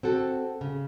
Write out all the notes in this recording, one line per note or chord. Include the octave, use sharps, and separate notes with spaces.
C4 F#4 A4
C#3